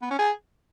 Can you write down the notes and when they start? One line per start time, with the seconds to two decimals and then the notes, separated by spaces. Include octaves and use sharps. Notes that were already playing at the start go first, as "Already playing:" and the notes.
0.02 B3
0.10 C#4
0.19 G#4